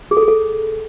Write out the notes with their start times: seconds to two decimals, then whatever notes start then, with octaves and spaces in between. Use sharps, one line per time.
0.11 G#4
0.17 A4
0.22 G#4
0.28 A4